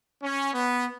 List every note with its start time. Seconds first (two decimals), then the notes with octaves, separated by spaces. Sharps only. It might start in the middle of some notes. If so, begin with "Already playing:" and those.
0.23 C#4
0.53 B3